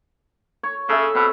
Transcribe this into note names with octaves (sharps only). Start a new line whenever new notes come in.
C#5
C#3 A4 E5
B2 C4